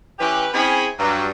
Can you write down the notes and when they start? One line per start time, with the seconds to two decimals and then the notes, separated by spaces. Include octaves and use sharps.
0.19 E3 C#4 G4 B4
0.53 C4 C#4 E4 G#4 G#5 B5
0.98 G2 F#3